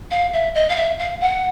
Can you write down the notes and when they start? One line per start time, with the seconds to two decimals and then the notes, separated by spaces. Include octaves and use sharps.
0.11 F5
0.33 E5
0.54 D#5
0.69 F5
0.76 E5
0.99 F5
1.20 F#5